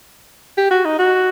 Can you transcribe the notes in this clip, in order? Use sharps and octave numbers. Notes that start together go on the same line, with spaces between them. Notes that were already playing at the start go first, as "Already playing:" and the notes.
G4
F#4
D#4
F#4